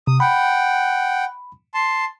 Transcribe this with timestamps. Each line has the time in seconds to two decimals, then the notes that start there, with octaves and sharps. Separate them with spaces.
0.07 C3 D#6
0.20 F#5 G5 B5
1.74 A5 C6